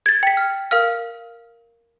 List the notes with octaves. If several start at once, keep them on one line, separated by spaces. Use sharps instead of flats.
G#6 A6
G5 B6
F6
A#4 F5 F6